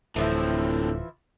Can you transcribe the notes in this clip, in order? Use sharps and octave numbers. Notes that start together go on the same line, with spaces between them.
D1 A2 D3 E3 F3 C4 E4